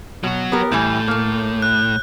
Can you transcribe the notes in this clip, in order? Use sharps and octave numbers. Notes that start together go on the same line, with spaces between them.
B2 F#3 F#4
B3 G4 A#4
A2 E3 G3 E4 G6
A3 A#3
F#6